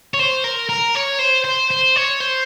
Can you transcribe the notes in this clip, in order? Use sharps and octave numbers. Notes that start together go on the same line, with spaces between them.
C#5
C5
A#4
A#4
C#5
C5
C5
C5
C#5
C5